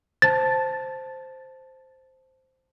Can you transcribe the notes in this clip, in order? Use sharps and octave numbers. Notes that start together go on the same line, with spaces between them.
C5 A5 A6